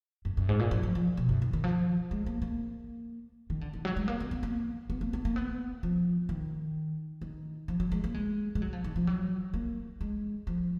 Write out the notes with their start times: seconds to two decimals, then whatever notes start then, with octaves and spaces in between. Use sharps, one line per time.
0.25 F#2
0.37 F#2
0.49 G#2
0.59 A#2
0.71 F#3
0.83 F3
0.95 F3
1.17 B2
1.29 F#2
1.42 D#3
1.53 D#3
1.64 F3
2.11 G#3
2.26 A#3
2.42 A#3
3.50 D#3
3.61 D3
3.73 D#3
3.85 F#3
3.96 G#3
4.08 A#3
4.20 B3
4.31 B3
4.43 A#3
4.90 B3
5.01 A#3
5.13 B3
5.25 A#3
5.36 B3
5.83 F3
6.29 D#3
7.21 D#3
7.68 F3
7.80 F#3
7.92 G#3
8.04 A#3
8.14 G#3
8.55 G#3
8.62 F#3
8.73 F3
8.84 D#3
8.96 F3
9.07 F#3
9.54 A#3
10.01 G#3
10.47 F3